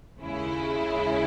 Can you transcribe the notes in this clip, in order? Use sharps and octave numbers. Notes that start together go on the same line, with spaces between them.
D#2 C#3 G#3 C#4 E4